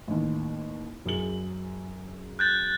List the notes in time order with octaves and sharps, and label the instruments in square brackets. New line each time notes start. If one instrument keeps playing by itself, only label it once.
[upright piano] A1 D#2
F#2 G#4 F#7
[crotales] F#6 G6 A6